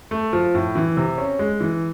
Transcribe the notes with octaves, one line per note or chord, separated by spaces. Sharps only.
A3
F3
A2
E3
C3
C#4
G#3
E3